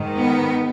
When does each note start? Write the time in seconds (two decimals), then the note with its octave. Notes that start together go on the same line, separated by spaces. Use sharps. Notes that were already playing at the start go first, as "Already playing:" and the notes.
Already playing: G#2 D#3
0.20 B3